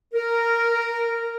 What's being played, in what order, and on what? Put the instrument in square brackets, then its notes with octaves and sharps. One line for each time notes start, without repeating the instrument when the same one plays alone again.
[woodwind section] A#4